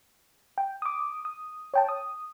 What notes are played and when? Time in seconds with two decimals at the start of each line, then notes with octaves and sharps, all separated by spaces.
0.58 G5
0.82 D6 D#6
1.25 D#6
1.74 C#5 G5 A5
1.89 D#6